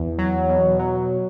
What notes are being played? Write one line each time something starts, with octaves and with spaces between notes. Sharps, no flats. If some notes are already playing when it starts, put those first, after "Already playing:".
Already playing: E2
F#3
B2
F#3